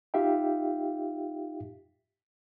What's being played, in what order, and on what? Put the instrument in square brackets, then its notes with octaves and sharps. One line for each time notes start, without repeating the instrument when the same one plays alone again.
[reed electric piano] D#4 F4 G4 E5 F5 G5